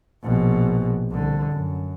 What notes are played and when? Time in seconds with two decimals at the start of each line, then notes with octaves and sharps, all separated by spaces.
0.24 A#1 B2
1.11 C2 D3
1.51 F#2